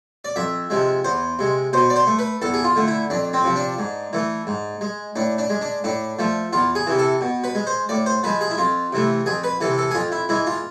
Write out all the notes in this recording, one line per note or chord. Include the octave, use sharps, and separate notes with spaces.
D5
F2 E5
C3 F3 G#3
E2 C5
C3 G#3
B2 C5
D5
C5
A3
B4
E2 A4
G#4
F4
D3 A3
E4
F2 D4
C4
C3 F3
D4
G#2
E3 A3
G#2
G#3
A2 D4
D4
G#3
D4
A2 D4
F3 A3
E2 F4
G#4
C3 E3
A4
B2
B4
G#3
C5
A2 D5
C5
F3 G#3 B4
G#4
E4
F2 F4
C3 E3 A3
F2 G#4
B4
C3 E3 A4
A4
G#4
F2 F4
E4
E3 G#3 E4
F4